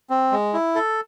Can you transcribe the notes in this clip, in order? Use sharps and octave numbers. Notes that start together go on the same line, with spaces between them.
C4
G#3
E4
A4